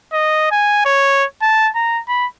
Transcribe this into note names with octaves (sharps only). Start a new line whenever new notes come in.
D#5
G#5
C#5
A5
A#5
B5